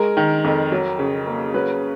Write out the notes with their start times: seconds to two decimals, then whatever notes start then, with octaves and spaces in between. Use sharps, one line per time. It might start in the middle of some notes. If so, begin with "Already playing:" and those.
Already playing: G#3 A#4
0.17 D#3
0.44 F2
0.72 F#3
0.99 C#3
1.27 A#3
1.54 F#3 B4